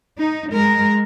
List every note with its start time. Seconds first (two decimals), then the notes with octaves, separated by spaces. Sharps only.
0.19 D#4
0.51 G#3 A#4